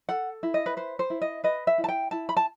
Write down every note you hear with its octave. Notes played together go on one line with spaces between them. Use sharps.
A4 F#5
E4
D#5
B4
B4 C5
C5
E4
D#5
B4 D#5
E5
E4
A5
G5
E4 A5
B5
A5